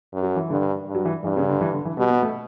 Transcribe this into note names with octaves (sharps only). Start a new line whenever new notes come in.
F#2
F#3
E3
G2 D3
G2
F#3
E3
G2 E3
C#3
D3
E3
D3
E3
B2 G3
B3
A3